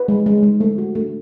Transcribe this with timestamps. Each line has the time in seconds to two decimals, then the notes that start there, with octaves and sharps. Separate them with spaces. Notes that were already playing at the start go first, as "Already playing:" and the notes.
Already playing: B4
0.08 G#3
0.26 G#3
0.43 G#3
0.60 A3
0.78 F#4
0.95 A3